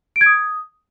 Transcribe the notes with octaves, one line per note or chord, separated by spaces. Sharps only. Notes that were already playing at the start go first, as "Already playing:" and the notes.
D7
G#6
D#6